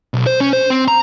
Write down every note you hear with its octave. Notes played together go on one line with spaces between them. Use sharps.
B1
C5
C#4
C5
C4
A#5